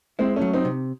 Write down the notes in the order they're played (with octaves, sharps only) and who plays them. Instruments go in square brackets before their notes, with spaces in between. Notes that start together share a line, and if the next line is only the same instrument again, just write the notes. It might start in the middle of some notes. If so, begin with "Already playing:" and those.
[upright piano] G#3 C4 [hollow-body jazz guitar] E4
[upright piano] A3 C#4
[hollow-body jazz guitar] F#3
[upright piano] C4 D#4
[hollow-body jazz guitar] C3